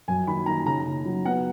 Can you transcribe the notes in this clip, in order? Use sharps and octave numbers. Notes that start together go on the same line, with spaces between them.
F#2 G#5
D#3 B5
D#3 A#5
C#3 A#5
C#3
F#3
B3 F#5